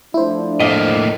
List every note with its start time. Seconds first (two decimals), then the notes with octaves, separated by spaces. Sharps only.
0.14 F3 A3 D4 E4 C5
0.60 A2 A#3 D#5